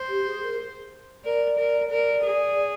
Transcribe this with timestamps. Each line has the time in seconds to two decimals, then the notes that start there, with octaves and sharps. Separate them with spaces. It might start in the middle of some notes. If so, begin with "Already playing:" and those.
Already playing: C5
0.08 G4
0.25 G#4
0.42 A#4
1.24 A#4 D5
1.58 A#4
1.91 A#4 D5
2.23 G#4